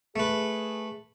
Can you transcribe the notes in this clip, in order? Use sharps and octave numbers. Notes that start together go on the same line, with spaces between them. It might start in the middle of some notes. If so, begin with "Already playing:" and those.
A3 G#4 B4